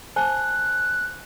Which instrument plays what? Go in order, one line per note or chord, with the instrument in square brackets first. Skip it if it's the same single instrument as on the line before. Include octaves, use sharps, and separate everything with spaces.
[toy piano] C5 G#5 A5 [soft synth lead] F#6